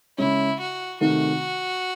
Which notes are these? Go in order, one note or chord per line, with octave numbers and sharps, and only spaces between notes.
C#3 G#3 C#4 E4
F#4
C3 D#3 A3 D#4 F#4